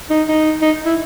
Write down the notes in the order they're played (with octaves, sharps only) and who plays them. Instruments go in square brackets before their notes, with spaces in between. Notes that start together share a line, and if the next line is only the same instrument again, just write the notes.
[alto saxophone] D#4
D#4
D#4
E4